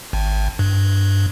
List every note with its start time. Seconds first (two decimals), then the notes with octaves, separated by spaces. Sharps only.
0.13 G#1
0.59 G2